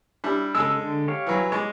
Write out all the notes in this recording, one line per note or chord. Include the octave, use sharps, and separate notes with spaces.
G3 D4 E4
C#3 G#3 A4 E6
D3
G4 C#5 F5
E3 F#3
G#3 C#5 D6